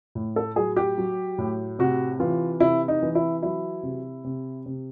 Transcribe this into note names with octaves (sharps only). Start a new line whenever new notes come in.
A2
A4
F#3 G#4
G4
F#3
A2
C3 F#4
E3 F4
C3 E4
D#4
E3
E4
F#3 E4
C3
C3
C3